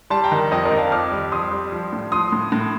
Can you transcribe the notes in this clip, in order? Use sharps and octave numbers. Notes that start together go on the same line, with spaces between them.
G3 A5 C6
G5 A#5
D#3
F2 C5 D#5
A#4 D5
D#3
F5 A5
F2 D6 F6
G3
F2 C6 D#6
G3
F3
A2
F3 C6 D#6
A2
A2